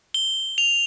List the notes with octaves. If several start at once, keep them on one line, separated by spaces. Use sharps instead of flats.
G7
F7